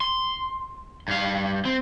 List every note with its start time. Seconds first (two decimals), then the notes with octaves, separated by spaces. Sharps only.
0.01 C6
1.08 G2 F5
1.65 C4